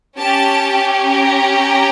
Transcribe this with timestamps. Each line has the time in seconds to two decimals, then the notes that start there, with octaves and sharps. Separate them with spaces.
0.18 C#4 G4 A5
1.09 A#5